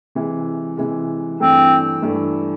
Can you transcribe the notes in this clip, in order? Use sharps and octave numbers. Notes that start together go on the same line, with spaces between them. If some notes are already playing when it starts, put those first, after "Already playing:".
C3 E3 G#3
C3 E3 G#3
G2 E3 A3 C4
G2 E3 A3